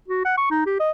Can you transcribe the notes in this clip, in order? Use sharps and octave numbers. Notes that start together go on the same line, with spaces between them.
F#4
F#5
C#6
D#4
G4
D#5